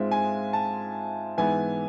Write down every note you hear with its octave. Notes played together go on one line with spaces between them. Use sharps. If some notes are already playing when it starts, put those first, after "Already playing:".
Already playing: G#2 G#3 C4 F4 E5
G#5
A5
G#2 E3 B3 E4 G#5